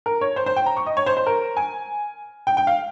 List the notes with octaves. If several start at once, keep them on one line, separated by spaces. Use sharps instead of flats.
A#4
C#5
C5
C5
G5
A#5
C#6
D#5
C#5
C5
C5
A#4
G#5
G5
G5
F5